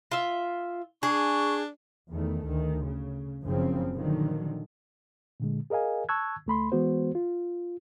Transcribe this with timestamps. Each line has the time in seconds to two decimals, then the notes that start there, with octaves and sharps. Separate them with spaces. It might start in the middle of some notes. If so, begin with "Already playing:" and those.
0.11 F4 E5
1.03 D4 G#4 C#6
2.11 E2 D#3 A3
2.45 D2 D#3
2.84 C#3
3.44 F#1 F#2 C#3 F3 C4
3.95 A#2 D3 D#3 F3 F#3
5.40 A#2 D3 G#3
5.70 G#4 A#4 D#5 F5 G#5
6.09 A5 C#6 E6 F#6 G#6
6.46 C#2 A3 B5 C6
6.72 E3 G#3 B3 F#4 C5
7.15 F4